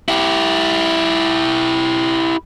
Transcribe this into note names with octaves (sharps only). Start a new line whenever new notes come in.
E4 G4